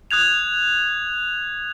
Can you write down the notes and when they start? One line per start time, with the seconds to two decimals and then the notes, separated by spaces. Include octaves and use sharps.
0.11 D#6 F#6 G#6 F7